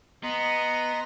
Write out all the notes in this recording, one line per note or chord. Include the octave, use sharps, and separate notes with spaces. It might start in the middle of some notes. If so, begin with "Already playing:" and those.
B3 D#5 A#5 C6